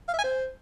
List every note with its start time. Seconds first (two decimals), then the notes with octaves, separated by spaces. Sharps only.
0.08 F5
0.13 E5
0.19 G#5
0.24 C5